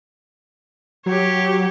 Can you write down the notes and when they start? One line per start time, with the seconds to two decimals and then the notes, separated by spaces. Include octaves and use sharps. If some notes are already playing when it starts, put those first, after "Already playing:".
1.06 F#3 G4 C#5